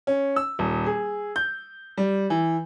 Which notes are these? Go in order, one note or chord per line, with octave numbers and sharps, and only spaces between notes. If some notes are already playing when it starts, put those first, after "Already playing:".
C#4
E6
D#1
G#4
G6
G3
E3